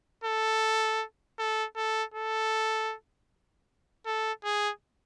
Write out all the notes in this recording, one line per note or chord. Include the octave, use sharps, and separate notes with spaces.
A4
A4
A4
A4
A4
G#4